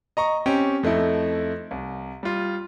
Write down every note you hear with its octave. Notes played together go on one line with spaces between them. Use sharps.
D#5 A#5 C#6
C4 C#4 G4 G5
F2 A3 D#4 E4
C2
G3 F4